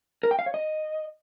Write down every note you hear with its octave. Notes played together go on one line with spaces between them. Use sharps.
A#4
G5
F5
C#5
D#5